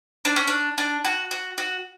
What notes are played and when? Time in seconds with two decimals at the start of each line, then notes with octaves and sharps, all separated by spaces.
0.25 D4
0.36 C#4
0.48 D4
0.78 D4
1.05 F#4
1.31 F#4
1.58 F#4